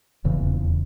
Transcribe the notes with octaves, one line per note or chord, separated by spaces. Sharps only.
D#1 E2 C#3 E3